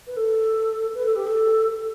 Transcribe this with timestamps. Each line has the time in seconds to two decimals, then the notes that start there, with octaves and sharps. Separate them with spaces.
0.07 B4
0.17 A4
0.95 B4
1.06 A4
1.16 G4
1.27 A4